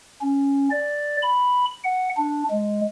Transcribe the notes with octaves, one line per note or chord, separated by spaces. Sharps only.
C#4
D5
B5
F#5
D4
G#3